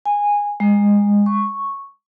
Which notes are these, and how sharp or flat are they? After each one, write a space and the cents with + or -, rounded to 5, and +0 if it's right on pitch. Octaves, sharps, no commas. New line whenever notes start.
G#5 -15
G#3 -25
C#6 -5